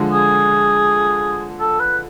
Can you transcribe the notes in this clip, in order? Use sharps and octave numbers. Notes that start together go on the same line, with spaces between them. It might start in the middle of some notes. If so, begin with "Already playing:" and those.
Already playing: D3 F3 G#3
G#4
A4
B4